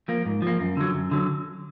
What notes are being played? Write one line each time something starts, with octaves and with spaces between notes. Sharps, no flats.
F3 A#3
G#2
F3 A#3
F#2
D3 F#3
F#2
D3 F#3